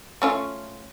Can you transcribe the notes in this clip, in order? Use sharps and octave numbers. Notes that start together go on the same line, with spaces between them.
A3 C#4 F4